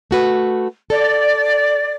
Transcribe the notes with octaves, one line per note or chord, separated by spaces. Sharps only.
A3 F#4 B4
A4 D5